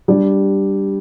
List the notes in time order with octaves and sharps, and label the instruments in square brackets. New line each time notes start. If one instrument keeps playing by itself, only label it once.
[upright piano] G3 D4 G4 D5